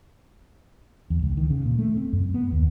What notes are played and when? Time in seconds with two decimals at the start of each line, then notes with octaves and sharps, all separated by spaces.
1.10 E2
1.23 C#2
1.37 D#3
1.50 C#3
1.66 A#2
1.79 A3
1.97 C4
2.13 F#2
2.34 B3
2.52 D#2